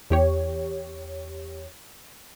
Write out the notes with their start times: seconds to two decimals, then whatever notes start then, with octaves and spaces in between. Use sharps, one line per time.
0.10 E2 G4 C#5